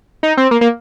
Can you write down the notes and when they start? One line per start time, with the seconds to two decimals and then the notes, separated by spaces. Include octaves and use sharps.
0.23 D#4
0.37 C4
0.51 A#3
0.61 A#3